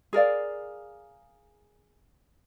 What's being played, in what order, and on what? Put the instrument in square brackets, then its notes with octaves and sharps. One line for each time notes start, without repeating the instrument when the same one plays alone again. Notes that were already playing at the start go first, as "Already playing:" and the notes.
[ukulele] G#4 A#4 D5 F5